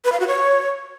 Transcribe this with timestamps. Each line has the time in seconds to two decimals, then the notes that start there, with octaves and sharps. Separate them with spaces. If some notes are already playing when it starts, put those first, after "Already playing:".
0.05 B4
0.12 F5
0.20 F#4
0.27 C#5